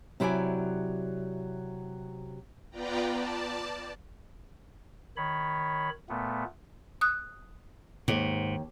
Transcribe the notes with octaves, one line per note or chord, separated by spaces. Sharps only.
C3 F#3 E4 C5 D5 G#5
B3 F4 B4 D5 G5 A#5
D5 A5
D#3 C#5 B5
A#2 A3 B3
D#6 F#6
D#2 G#2